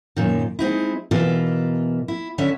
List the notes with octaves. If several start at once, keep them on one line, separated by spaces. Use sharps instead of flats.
F#2 A#2 D#3
G#3 C4 D#4 E4
B2 E3 F4 A#4 D5 E5
E4
D3 C#4 E5